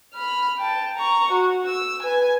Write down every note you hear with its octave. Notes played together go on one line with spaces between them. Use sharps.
B5 F6
G5 A5
A#5 C#6
F#4
E6
B4 G#5